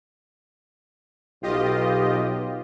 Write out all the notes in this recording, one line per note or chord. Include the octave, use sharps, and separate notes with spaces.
B1 F4 G4 D#5